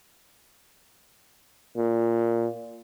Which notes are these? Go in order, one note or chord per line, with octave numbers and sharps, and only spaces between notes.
A#2